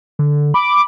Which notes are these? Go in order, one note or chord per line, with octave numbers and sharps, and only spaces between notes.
D3
B5 D6